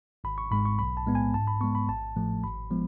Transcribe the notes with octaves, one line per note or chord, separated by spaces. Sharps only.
G#1 B5
C#6
G#2 G#3 B5
C#6
B1 B5
A5
A2 G#3 B3
G#5
G#2 A5
B5
G#3 B3 C#6
B5
A1 A5
A2 F3 A3
G#1 B5
F3 G#3 B3